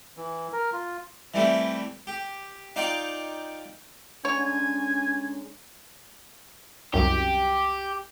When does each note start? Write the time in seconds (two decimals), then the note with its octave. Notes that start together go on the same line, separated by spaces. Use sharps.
0.17 E3
0.53 A#4
0.73 F4
1.34 E3 G3 A3 C4
2.07 G4
2.76 D#4 F4 D5 F5 G5
4.25 D3 G#3 C#4 D#4 C#5 G#5
6.94 C2 F#2 G4